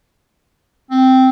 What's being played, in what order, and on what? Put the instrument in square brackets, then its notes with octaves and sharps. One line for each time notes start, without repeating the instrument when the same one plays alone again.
[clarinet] C4